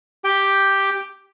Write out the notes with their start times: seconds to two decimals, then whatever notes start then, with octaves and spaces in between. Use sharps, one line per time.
0.24 G4 G5